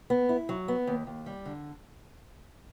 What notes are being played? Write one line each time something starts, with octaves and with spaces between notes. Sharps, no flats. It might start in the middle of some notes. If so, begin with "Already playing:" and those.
B3
E4
F#3
B3
D#2
D#2
G3
D3